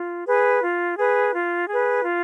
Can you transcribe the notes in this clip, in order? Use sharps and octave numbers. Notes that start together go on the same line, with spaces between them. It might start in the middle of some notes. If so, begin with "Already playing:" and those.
Already playing: F4
G#4 B4
F4
G#4 B4
F4
G#4 B4
F4